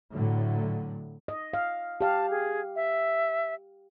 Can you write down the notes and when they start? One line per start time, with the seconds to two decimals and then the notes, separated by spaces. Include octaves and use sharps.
0.12 A2 D3 F#3
1.28 D#5
1.53 F5
2.01 G4 F5 A5
2.31 G#4
2.76 E5